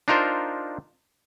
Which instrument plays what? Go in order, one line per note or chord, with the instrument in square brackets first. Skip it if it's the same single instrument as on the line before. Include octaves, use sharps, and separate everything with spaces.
[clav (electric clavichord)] D4 D#4 F4 A#4 C5